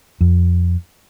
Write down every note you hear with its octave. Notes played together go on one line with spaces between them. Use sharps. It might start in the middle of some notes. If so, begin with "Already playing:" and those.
F2